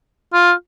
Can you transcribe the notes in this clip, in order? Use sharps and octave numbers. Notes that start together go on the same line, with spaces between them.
F4